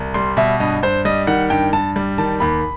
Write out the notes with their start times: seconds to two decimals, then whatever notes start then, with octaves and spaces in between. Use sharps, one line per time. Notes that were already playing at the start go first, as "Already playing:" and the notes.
Already playing: C2
0.14 G3 C6
0.37 B2 E5
0.60 G2 D#5
0.83 G2 C5
1.05 G3 D#5
1.27 D#3 F#5
1.50 G2 G5
1.73 G2 A5
1.96 G3
2.18 D#3 A5
2.40 D#2 B5